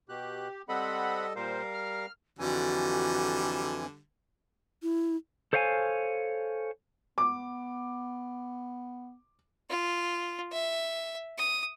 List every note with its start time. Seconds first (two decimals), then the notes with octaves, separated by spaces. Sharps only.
0.09 B2 G4 F#6
0.69 G3 C4 A4 D#5 F#5 B5
1.36 A#2 G3 A#4 C5 F5
1.74 F6
2.39 F2 D3 E3 G3 F#4 G#5
4.83 E4
5.53 A4 C5 C#5 F5 G5 G#5
7.18 B3 D6
9.70 F4
10.52 E5
11.38 D#6